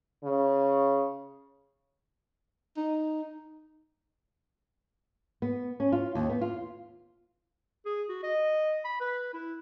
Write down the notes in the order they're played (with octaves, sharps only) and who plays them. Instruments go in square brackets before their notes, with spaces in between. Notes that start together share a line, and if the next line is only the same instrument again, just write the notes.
[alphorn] C#3
[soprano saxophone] D#4
[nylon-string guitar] B3
C#4
F4
D#2
B3
F4
[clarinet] G#4
F#4
D#5
B5
B4
E4